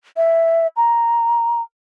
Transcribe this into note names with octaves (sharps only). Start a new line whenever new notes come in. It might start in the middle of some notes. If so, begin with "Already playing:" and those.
E5
A#5